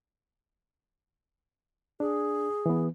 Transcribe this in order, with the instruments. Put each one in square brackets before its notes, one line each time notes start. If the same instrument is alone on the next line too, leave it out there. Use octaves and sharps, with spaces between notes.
[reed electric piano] D4 [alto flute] G#4
[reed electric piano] E3 B3